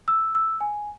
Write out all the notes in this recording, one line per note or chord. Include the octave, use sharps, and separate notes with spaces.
E6
E6
G#5